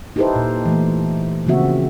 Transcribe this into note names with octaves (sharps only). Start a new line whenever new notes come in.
D#4 E4 G4 A4 B4 C5
A#2
E3 A3
C#3 F3 A#3 C4 F#4 E5